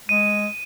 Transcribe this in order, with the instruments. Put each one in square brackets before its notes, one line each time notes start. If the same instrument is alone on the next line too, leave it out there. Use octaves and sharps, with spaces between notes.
[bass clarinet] G#3 [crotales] D#7